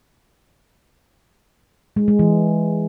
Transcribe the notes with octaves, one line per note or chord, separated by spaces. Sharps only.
G#3
G#3
E3